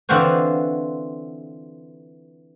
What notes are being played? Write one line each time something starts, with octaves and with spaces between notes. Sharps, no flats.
D3 E3 C4 F4 F#4 C5